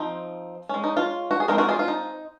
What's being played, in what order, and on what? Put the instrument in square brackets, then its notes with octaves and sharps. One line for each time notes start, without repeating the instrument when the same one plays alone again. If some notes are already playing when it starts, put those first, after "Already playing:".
Already playing: [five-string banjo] F3 C4 D#4
G#3 C#4
D#4
F4
F#4
G#4
G#3 C4 D#4 F#4 A#4
F#4 A#4
F4 G#4
F4
D#4